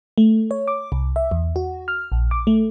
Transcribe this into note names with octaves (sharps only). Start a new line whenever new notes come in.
A3
C#5
D6
C2
E5
E2
F#4
F6
A#1
D6
A3